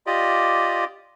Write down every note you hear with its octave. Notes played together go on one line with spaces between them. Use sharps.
F4 G4 D5 D#5